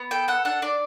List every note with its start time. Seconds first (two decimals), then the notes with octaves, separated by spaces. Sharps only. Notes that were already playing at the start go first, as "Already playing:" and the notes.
Already playing: B3
0.11 A4 G5
0.28 A4 F#5
0.45 D4 F#5
0.62 D4 D5